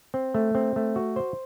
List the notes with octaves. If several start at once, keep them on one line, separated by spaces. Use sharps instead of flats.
C4
A3
C4
A3
F#4
C5